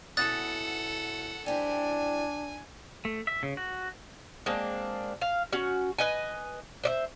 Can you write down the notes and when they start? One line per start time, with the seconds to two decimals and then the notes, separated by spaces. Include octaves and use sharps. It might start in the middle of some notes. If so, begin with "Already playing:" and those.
0.17 B2 C#4 E4 A4 F#5 D#6 F#6 A6
1.46 G3 C4 D4 E4 G#5
3.05 A3
3.27 E5
3.43 C#3
3.57 F#4
4.46 G#3 A#3 C4 D4
5.21 F5
5.53 C#4 F#4
5.98 B4 D#5 G#5
6.83 C5 D5 E5